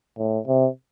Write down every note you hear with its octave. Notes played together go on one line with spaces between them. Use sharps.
A2
C3